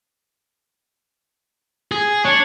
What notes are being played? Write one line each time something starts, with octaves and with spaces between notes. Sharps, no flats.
G#4
D4 C#5